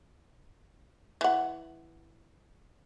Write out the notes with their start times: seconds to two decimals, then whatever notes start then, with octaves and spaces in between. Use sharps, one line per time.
1.21 E3 F#5